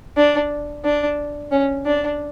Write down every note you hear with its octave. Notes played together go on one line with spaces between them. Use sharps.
D4
D4
C#4
D4